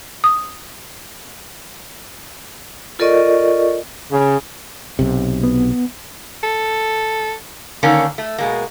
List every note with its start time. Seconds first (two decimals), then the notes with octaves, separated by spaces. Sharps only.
0.24 D#6
2.99 F4 A4 A#4 D5 D#5 C#6
4.10 C#3
4.99 B1 C3
5.44 B3
6.43 A4
7.83 D3 D#3 A#3 C#4 A4
8.18 A3
8.38 B2 G#3 A#3